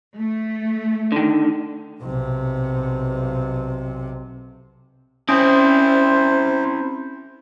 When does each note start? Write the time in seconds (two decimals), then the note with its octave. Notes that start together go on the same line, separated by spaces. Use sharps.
0.18 A3
1.12 D3 D#3
2.02 B1 C3
5.29 C4 C#4 E4 C5